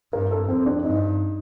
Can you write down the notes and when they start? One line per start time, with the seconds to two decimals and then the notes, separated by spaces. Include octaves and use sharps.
0.13 G2 A#4
0.31 A4
0.48 F2 C4
0.66 D4
0.84 G2 D#4